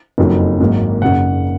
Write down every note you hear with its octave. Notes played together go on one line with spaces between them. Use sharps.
F#1 F2 D#3 F#3
G#1 G#2 D#3 F#3 A#3
F#1 F#2 C#3 F#5